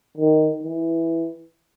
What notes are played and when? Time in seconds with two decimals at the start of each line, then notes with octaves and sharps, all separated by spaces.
0.17 D#3
0.63 E3